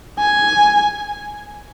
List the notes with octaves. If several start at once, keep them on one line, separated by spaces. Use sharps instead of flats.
G#5